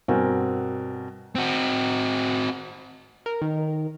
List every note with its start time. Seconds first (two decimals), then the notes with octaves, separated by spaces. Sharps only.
0.08 G2 B2 C4 A#4 F#5 G#5
1.35 C4 F#4
3.26 A#4
3.42 D#3